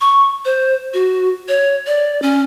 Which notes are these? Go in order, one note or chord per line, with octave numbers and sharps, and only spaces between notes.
C#6
C5
F#4
C#5
D5
C#4